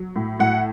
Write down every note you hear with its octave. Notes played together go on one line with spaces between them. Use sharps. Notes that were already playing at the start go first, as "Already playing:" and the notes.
Already playing: F#3
A2
A2 F#5